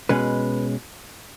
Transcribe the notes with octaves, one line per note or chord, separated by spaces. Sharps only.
B2 G#3 C#4 B4